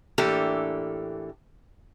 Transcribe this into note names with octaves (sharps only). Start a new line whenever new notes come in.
A2 E3 A#3 D4 G4 A4